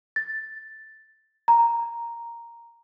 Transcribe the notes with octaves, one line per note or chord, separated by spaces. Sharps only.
A6
A#5